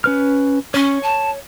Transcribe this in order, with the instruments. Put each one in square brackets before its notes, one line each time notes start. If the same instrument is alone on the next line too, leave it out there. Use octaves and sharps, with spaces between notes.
[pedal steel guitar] C#4 B4 F6
[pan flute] C#4 [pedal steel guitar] C#5 C#6
[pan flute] A5